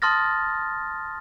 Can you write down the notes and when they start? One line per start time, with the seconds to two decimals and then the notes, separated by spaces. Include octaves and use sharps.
0.02 A5 C6 D#6 F6 A6 A#6